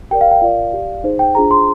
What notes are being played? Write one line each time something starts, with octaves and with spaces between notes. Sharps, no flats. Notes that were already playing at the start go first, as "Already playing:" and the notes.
G4 A#4 D5 G5
F5
G5
F4 A#4 D5 F5
G4 D5
D#4 G#4 C5
G5
D4 F4 G#4 C5 A#5
C6